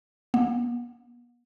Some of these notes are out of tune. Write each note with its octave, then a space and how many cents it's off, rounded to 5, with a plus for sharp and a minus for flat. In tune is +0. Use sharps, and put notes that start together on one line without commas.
B3 -45